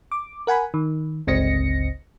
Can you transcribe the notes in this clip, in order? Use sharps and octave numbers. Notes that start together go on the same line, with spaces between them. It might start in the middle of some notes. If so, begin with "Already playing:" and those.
D6
A#4 F#5 G#5 B5
D#3
G1 C#2 C4 D#5 A#6 C#7